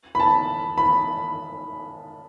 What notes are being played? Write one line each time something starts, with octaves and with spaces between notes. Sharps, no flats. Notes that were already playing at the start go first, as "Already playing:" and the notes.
B5
A5
B5